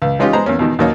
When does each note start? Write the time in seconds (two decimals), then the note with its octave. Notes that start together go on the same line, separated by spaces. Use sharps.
0.02 C#2
0.19 E3 G#3 C#4 D#4 F4 G4
0.33 G#3 B3 C5 A#5
0.46 E2 A#3 C#4
0.59 E2 B2 D#3
0.79 D#2 F#3 A#3 D#4 C#5